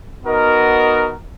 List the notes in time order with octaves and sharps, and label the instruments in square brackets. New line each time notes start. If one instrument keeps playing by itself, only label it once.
[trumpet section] B3 D#4 F#4 A#4 D#5